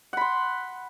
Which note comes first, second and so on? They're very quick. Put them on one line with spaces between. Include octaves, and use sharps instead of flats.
F#5 B5 C6